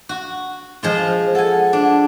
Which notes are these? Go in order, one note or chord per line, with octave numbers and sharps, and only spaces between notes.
F#4
F3 G#3 F4
C5
A4 F#5 G#5
D4